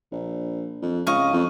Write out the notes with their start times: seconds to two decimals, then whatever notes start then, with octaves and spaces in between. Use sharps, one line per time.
0.12 A#1
0.82 F2
1.07 C#2 D#5 F5 C#6
1.33 F2